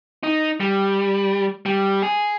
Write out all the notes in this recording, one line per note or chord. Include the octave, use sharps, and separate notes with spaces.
D#4
G3
G3
G#4